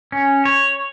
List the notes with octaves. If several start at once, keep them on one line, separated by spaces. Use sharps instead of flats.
C#4
C#5